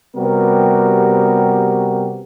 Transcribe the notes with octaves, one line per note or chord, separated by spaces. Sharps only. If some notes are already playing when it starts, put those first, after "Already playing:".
C3 G3 B3 F#4 G4 A#4